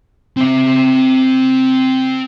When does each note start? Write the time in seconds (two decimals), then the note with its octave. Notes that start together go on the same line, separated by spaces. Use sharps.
0.37 C4 E5